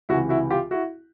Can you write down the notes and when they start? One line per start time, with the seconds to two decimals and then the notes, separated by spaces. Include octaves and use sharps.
0.09 C#2 C3 E3 E4 F#4
0.29 E4 F#4
0.50 F4 G4
0.71 E4 F#4